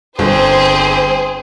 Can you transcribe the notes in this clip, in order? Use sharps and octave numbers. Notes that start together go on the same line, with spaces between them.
G1 C4 G#4 C5